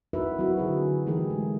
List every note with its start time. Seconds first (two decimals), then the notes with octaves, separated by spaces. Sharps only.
0.13 D#4 E4 F#4 A#4 B4 E5
0.39 F#3 C4 E4 F#4
0.57 D3 G#4 B4
1.07 E3 A3 D#4 G4 G#4 A#4
1.30 G#3